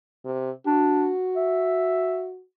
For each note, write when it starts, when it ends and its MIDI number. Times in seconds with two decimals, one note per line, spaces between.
0.25 0.50 48
0.67 1.12 62
0.67 2.41 66
1.36 2.26 76